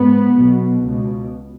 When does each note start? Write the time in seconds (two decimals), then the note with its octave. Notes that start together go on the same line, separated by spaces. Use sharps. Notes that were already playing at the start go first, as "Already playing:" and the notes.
Already playing: G#2 B3
0.35 B1 B2
0.83 C#2 B2